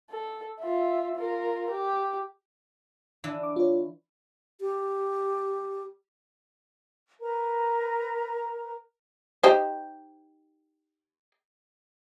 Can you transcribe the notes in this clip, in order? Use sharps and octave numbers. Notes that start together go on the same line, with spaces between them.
A4
F4 E5
F4 A#4
G4
E3 D4 E4
D6
F4 C#5
G4
A#4 B4 A#5
D#4 G4 C5